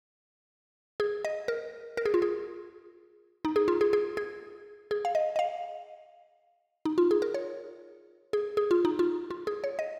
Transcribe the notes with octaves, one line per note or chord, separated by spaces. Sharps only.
G#4
D#5
A#4
A#4
G#4
F4
G#4
D#4
G#4
F4
G#4
G#4
G#4
G#4
F5
D#5
D#5
F5
D#4
F4
G#4
A#4
C#5
G#4
G#4
F4
D#4
F4
F4
G#4
C#5
D#5